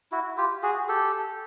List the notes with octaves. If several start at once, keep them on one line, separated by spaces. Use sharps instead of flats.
E4 F#4
F4 G4
F#4 G#4
G4 A4